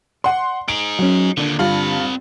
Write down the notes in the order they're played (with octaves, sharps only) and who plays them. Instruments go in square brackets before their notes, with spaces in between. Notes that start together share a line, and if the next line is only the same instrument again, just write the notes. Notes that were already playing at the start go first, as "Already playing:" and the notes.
[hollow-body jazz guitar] D5 [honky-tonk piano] F#5 C6
[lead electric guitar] D#4 G#4 [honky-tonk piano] D7
[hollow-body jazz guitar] F#3 C#4
[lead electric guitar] D#2 A#2 [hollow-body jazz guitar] D3 D4
[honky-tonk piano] G2 F4 [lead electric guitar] C4 B5